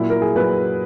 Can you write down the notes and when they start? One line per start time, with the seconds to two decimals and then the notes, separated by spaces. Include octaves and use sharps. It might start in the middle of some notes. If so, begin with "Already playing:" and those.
Already playing: A#2 F#3 E4
0.10 A#4
0.22 G#4
0.36 A#2 F#3 B4